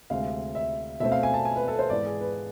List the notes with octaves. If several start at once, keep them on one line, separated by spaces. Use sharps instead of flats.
D2 C3 G#3 F5
E5
B2 A3 C4 E5
F5
G#5
A5
G#5
B4
A4
C5
G#2 E3 B3 D5
G#4
B4